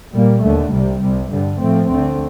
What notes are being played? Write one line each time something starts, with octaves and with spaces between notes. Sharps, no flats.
A#2 G3 A#3
D#2 D3 A3
C2 C3 G3
C2 C3 G3
G2 D3 G3
A2 F3 A3 C4
D2 D3 A3 C4